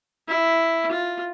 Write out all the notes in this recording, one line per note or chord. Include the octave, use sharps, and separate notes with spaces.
E4
F4